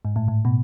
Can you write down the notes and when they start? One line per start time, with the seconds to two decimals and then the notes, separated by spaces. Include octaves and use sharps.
0.05 G#2
0.16 A2
0.28 A2
0.45 B2